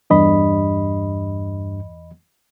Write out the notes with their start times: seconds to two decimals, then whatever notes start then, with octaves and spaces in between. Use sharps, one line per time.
0.10 E2 G2 D#5 B5